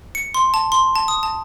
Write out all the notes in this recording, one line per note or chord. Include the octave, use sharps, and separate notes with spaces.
C#7
C6
A5
C6
A5
D#6
A5